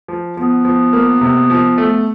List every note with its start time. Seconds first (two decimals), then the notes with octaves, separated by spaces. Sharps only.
0.08 F3
0.37 F3 B3
0.65 F3
0.93 A#3
1.21 C3
1.50 F3
1.78 A3